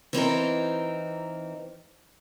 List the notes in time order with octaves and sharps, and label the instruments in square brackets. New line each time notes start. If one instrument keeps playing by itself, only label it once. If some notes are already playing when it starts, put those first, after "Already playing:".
[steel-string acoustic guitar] E3 C4 D#4 A#4